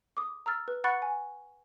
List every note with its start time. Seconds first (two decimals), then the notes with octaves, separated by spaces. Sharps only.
0.17 D6 D#6
0.46 A#5 E6 F6 A6
0.68 B4
0.84 F#5 B5 C#6 F#6 A6 C#7
1.02 G#5